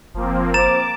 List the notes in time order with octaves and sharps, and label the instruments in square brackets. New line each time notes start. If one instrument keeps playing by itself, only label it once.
[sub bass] F#1 [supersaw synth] F3 A#3 C4
[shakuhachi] C5 [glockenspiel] A#5 A6 E7 [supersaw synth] D6